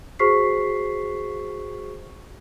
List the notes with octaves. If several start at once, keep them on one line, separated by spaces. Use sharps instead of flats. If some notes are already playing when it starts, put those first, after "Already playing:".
F#4 G#4 C5 C#6 B6 C7